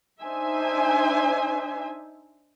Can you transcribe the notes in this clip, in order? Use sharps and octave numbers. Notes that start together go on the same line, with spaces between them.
D4 D#4 C5 E5 G#5